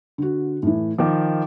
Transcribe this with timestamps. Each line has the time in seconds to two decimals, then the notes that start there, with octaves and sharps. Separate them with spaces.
0.18 D3 F#4
0.63 A2 E3
0.98 D#3 F3 D6